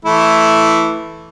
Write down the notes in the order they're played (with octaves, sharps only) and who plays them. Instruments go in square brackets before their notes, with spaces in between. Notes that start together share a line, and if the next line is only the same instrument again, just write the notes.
[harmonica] E3 A3 E4